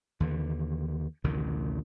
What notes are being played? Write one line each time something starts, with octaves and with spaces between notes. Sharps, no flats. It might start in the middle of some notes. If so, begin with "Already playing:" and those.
D#2 D3 E3
A1 D2 C3 D#3